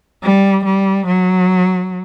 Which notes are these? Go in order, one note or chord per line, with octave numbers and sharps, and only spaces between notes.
G3
G3
F#3